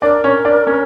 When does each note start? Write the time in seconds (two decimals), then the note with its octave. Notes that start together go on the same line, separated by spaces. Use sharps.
0.02 D4 A#4 D5
0.24 C#4 C#5
0.45 D4 D5
0.67 C#4 C#5